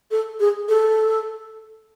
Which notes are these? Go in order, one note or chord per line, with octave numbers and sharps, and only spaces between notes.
A4
G#4
A4